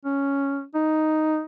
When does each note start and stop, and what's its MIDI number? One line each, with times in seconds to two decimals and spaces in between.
0.05 0.64 61
0.75 1.42 63